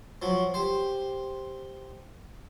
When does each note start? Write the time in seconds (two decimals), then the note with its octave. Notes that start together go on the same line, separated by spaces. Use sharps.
0.22 F3 F#3
0.54 G4 C5